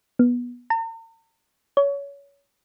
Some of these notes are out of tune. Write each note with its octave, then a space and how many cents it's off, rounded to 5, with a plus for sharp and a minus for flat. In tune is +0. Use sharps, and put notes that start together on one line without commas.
B3 -20
A#5 -45
C#5 +25